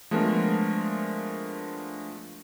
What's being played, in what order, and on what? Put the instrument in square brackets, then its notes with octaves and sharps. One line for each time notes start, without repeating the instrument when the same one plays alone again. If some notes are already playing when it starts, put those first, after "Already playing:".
[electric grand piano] F3 G#3 A3 B3 D4 A#4